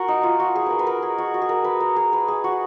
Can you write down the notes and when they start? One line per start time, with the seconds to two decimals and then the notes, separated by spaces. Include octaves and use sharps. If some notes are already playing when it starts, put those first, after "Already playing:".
Already playing: F#4 A#4
0.08 D#4
0.23 F4
0.40 F#4
0.55 G#4
0.66 A#4 B4
0.79 B4
0.87 A#4
1.02 G#4
1.18 F#4
1.34 F#4
1.42 G#4
1.49 A#4
1.64 B4
1.80 A#4
1.96 G#4
2.13 B4
2.28 G#4
2.44 F#4